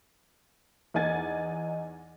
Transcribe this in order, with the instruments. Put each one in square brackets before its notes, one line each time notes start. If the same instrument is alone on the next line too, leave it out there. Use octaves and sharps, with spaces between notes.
[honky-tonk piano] E2 D#4 F#5 G#5 G#6 A6